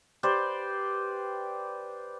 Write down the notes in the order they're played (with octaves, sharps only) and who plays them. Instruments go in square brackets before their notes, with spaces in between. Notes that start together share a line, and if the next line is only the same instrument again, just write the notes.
[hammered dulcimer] G4 B4 C5 D5